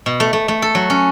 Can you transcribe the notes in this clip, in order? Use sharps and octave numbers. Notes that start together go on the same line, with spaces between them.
B2
A3
A3
A3
A4
F#3
C#4